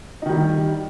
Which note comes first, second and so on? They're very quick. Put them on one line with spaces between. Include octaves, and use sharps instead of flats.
D#4 D#3 G3